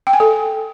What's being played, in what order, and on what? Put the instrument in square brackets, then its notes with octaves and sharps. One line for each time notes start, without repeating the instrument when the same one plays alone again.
[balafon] G5
G#5
A4